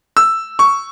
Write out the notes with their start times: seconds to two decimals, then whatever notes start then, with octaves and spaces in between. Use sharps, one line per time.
0.17 E6
0.59 C#6